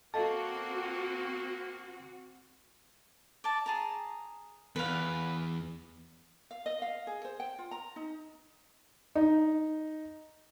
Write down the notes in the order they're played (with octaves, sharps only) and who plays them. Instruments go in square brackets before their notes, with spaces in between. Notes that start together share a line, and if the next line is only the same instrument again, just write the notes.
[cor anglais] A#3 [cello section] C4 F#4 [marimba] A4 D#5 F5 [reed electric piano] A5
[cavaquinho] D5 A5
G#4 A5 A#5
[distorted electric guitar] E2 [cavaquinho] B4 F5
[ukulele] F5
D#5
F5
G#4
C5
G5
F4
A#5
D#4
[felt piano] D#4